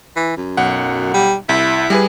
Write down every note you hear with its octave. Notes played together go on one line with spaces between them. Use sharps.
E3
F#2
B1 F#5
G3
C2 E4
G3 G#4 B4